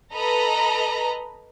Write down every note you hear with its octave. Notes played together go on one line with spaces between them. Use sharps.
A4 B4 D#5 A#5 B5